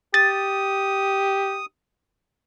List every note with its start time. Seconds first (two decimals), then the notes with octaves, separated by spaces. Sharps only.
0.14 G4 D#6 A6